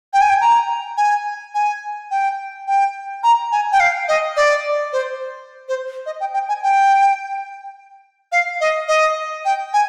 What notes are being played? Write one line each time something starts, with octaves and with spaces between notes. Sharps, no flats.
G5
G#5
G5
A#5
G#5
G#5
G5
G5
A#5
G#5
G5
F5
D#5
D5
C5
C5
D#5
G5
G5
G#5
G5
F5
D#5
D#5
G5
G#5